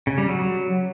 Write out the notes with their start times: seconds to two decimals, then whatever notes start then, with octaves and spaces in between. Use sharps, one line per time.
0.07 C#3
0.18 G3
0.29 F#3